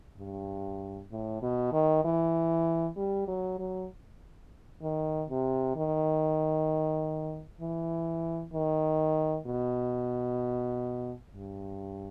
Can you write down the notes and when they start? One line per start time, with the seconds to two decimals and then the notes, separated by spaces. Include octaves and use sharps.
0.18 G2
1.11 A2
1.42 B2
1.72 D#3
2.04 E3
2.97 G3
3.28 F#3
3.59 F#3
4.82 D#3
5.29 C3
5.76 D#3
7.61 E3
8.53 D#3
9.47 B2
11.32 G2